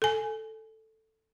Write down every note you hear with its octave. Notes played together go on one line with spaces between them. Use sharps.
A4 G#5